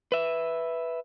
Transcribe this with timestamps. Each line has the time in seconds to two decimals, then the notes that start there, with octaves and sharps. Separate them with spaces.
0.12 B4 E5